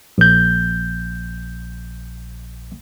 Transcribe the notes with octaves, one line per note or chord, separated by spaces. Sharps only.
A#1 G6